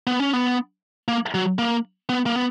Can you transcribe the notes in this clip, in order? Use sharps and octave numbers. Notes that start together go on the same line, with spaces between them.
B3
C#4
B3
A#3
F#3
A#3
B3
A#3
B3